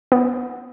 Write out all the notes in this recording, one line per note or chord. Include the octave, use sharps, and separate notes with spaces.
B3